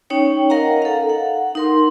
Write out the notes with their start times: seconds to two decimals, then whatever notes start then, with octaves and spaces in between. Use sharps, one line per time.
0.10 C#4 D#4 C#5 G5
0.50 A#4 D#5 F5 F#5 A#5
0.82 A4 F5
1.09 F#5
1.55 D#4 A#4 C6